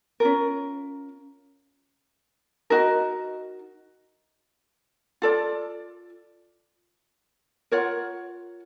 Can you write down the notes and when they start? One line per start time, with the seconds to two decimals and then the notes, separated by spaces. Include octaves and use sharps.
0.20 C#4 F4 A#4
2.70 D#4 F#4 A#4 D#5
5.22 F4 A4 D5
7.71 F4 A#4 C#5 F#5